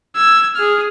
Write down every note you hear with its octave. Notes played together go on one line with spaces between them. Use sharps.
E6 G#6
G#4 F6